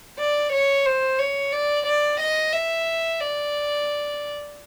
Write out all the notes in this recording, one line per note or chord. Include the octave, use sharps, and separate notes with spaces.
D5
C#5
C5
C#5
D5
D5
D#5
E5
D5